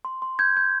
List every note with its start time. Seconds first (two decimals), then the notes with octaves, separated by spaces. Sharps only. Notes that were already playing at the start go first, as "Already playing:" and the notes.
0.05 C6
0.22 C6
0.39 G6 G#6
0.57 G6